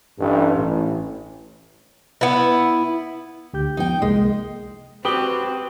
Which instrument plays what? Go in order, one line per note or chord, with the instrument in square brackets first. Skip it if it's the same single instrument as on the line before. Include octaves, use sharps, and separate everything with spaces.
[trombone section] A1 G2
A1
[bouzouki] B3 E4
[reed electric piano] D2 G4 G6
[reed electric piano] F3 B3 [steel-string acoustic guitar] D#4 G5
[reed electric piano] C2 A#3 D#5 [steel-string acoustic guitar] G#3
[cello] C4 [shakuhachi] F#4 [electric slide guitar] G4 B4 [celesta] G5 D#6 G7